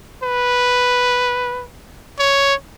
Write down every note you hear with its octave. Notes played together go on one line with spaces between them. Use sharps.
B4
C#5